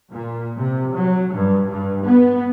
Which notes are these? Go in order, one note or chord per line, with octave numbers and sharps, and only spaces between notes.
A#2
C3
F#3
G2
G2
B3